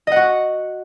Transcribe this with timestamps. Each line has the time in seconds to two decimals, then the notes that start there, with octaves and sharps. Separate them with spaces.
0.07 D#5
0.12 F#5
0.16 F#4